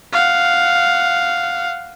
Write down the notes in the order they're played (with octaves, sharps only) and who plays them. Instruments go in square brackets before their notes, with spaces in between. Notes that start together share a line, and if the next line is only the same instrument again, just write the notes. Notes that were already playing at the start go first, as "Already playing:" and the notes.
[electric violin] F5 F#5